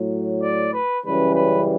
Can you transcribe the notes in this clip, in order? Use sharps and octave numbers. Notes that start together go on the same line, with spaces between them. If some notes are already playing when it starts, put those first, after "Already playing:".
Already playing: A2 F#3
D5
B4
F#2 C#3 E3 G3 B4
B4